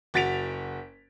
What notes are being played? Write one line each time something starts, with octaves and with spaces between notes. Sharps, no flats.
F#1 F#4 A6 B6 D7 F7